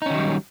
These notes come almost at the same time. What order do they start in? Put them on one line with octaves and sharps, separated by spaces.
D#4 C#4 D#3 F#3 G3